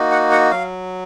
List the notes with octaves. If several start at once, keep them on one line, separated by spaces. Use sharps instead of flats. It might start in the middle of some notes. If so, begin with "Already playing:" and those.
Already playing: A#3 D#4 F#4
F#5
F#5
F#3 F5